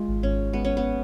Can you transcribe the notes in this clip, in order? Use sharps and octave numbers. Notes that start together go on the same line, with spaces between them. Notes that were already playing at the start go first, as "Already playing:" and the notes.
Already playing: G#3 F4
G#1
G#1 C#4
G#1
G#3 B3
G#1 C#4
B3